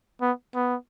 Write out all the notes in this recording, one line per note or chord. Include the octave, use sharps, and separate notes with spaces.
B3
B3